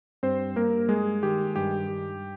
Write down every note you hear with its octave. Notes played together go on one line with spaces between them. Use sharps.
G2 C4 C5
G2 A#3 A#4
G#3 G#4
D#3 G4
G2 G4
G2